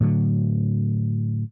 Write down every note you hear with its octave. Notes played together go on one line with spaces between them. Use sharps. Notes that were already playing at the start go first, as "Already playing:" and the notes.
A2 D3 F#3